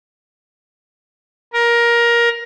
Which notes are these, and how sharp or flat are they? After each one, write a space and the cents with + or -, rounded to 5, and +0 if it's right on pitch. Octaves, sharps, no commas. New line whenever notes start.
A#4 +15